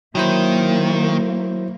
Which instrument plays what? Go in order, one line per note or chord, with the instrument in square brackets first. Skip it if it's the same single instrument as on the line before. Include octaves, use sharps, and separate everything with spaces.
[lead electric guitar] D#3 [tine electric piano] F#3 E4 C5 [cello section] A#3